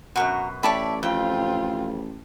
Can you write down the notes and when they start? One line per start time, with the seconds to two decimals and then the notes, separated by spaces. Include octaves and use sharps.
0.16 F#2 B2 F#4 A#4
0.63 A1 C#5 D5 E5 G5 A5 B5
1.03 F2 C4 F4 G5